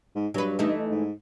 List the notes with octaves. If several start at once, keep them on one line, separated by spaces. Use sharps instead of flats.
G#2
G2 F#3 B4
E3 A3 D#4
G#2